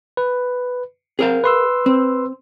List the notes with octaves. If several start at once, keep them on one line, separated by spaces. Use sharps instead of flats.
B4
C4 G#4 A#4 F5
B4 C6 E6
C4